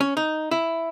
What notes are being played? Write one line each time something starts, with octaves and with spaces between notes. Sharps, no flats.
C#4
D#4
E4